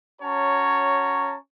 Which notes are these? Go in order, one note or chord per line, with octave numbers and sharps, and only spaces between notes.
C#4 F#4 C#5 A5 A#5